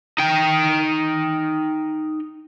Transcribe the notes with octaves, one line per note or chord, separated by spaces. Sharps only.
D#4 G5